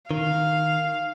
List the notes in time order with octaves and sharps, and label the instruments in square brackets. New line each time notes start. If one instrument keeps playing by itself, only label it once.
[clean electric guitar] D#3 [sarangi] F5